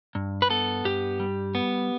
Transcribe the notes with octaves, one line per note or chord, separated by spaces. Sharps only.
G2
B4
B3 A4
G2 G4
G3
B3